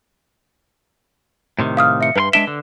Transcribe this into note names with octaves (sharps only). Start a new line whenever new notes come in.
A2 C3 D#3
F5 D#6 F6
E5 C#7
G2 A#4 B4 C6
G#3 D4 E5 D7 E7 G7
D3